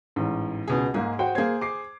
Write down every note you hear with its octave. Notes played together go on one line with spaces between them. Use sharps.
A1 G#2
C#2 B2 G#4
G#2 G#3 A#3 G#4
F#4 C5 G5
A#3 G#4 C5 G#6
D6 C7